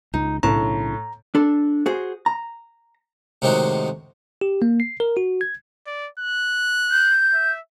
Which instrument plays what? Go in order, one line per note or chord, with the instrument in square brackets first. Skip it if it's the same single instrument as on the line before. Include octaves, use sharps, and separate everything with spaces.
[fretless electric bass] C#2 [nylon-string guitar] D#4
[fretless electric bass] B1 C#3 D4 [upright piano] A2 [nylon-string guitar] A5 [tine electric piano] A#5
[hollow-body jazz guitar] D4 A4
F#4 G#4 C5
A#5
[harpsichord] A2 C3 D#3 G#3 F#4
[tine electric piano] G4
A#3
C7
A#4
F#4
G#6
[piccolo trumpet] D5
F#6
[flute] G6
[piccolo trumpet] E5